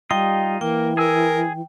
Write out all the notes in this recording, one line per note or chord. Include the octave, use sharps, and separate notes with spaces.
G3 D#4 F4 D#5 G5
E3 A#3 A#4 G5
G#4 A#4 G#5 E6